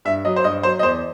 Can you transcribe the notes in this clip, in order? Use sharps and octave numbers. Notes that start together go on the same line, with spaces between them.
G2 E5
F#3 D#5
C5
G2 D#5
F#3 C5
D#5
E2 C5